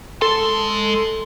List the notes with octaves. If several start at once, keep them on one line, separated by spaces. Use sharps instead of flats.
G#3 A4 C6